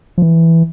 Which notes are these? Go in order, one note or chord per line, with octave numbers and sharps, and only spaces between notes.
F3
E3